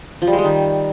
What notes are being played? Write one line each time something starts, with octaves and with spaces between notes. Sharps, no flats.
F3
G3
G#3
G3
D#3